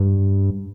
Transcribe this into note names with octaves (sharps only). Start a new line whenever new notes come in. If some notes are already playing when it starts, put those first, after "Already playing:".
Already playing: G2